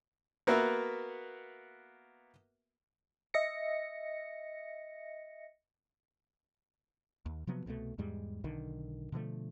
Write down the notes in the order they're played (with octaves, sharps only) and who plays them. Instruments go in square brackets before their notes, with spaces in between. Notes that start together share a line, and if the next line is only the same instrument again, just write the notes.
[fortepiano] A#3 B3 F#4 A#4 E5
[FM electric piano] D#5 E5 A#6 C#7
[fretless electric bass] D#2
C3 F3 F#3 B3
C2 B2 D3 A3
E2 G#2 G3 G#3
B1 D3 D#3
B2 D3 F3 A3